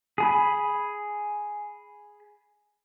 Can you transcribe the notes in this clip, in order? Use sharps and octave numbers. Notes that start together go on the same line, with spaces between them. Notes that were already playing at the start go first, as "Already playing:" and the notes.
G#4 G#5 B5